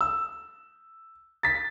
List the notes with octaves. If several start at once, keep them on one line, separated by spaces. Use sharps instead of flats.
E6
A6 B6